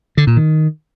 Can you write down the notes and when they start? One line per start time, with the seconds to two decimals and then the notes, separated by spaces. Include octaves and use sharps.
0.17 D3
0.27 A#2
0.37 D#3